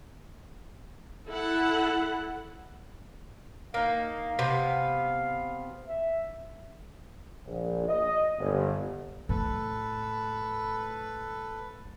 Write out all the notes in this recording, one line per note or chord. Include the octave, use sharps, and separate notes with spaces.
E4 A4 F#5
A#3 D#4 F5
C3 B3
E5
A#1
D#5
G1
A2 A4 B4